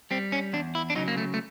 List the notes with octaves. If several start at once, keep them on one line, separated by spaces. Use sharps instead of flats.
G3 C4
C#4
E2 D4
E4
D4
C#3 F#3 D#4
A#3
A3
A3